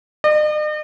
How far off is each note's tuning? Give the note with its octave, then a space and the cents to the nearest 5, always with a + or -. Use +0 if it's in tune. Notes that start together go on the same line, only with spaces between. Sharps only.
D#5 -45